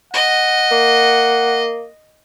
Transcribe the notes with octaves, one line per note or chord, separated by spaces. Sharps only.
D#5 F#5
A#3